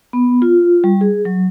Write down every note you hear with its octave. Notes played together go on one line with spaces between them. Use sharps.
B3
F4
G3
G#4
F#3